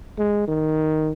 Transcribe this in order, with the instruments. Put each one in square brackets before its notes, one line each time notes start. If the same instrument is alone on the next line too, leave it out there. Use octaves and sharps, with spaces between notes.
[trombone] G#3
D#3